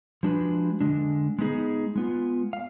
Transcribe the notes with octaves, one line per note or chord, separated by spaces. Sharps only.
F3 G#3 D4 F#4 B4
D3 G#3 D4
G#3 B3 D#4 G#4
G#3 B3 F4
F5